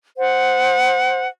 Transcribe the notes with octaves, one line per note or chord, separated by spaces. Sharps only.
C5 F#5